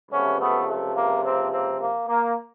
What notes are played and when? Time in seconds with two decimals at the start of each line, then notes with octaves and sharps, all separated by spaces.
0.11 C#2 C3 F3 A3 B3 C#4
0.39 A3 B3
0.67 A3
0.95 A#3
1.23 A#3 C4
1.51 A#3 C4
1.79 A#3
2.07 A#3